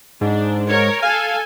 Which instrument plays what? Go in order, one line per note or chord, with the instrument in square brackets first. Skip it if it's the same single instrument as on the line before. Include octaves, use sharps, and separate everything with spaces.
[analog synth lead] G#2 [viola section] D4
[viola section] A#4 C#5
[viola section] A4 G#5 [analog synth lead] F5